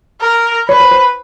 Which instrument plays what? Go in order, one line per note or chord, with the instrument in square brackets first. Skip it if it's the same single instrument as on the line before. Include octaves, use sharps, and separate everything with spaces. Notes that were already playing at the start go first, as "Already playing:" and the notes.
[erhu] A#4
[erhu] B4 [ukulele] C#5
[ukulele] C5
C5